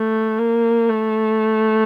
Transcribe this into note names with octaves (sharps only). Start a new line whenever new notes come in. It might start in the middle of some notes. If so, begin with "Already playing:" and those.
Already playing: A3
A#3
A3